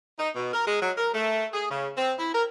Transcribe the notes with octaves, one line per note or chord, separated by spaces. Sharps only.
D#4
B2
A#4
G#3
F#3
A#4
A3
G#4
C#3
C4
E4
A#4